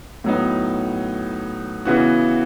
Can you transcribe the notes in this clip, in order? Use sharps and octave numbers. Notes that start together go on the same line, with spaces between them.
A2 F#3 B3 D#4
C#3 E3 B3 F#4